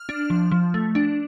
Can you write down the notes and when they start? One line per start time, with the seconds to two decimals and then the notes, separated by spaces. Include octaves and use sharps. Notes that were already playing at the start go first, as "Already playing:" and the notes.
Already playing: F6
0.09 D4
0.30 F3
0.51 F3
0.74 A3
0.95 D4